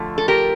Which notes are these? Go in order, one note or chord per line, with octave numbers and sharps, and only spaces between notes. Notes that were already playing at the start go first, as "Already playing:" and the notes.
Already playing: D3 F3 A3
A4
G4 A#4